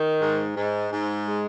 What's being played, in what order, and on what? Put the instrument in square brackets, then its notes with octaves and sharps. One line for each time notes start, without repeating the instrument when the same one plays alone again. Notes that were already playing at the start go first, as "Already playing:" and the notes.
Already playing: [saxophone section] D#3
G#2
G#2
G#2
G#3